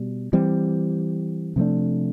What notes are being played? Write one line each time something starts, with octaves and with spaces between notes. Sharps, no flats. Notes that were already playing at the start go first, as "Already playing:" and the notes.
Already playing: B2 G3
E3 G3 C4
C3 F3 A3 D4